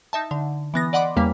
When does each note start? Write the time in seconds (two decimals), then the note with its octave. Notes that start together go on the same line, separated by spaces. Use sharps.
0.13 D#4 E5 A5
0.31 D3
0.74 E3 B3 A#6
0.93 D5 D#5 F#5 B5 C6 D6
1.16 E2 C#3 G3 A#3 F5 B6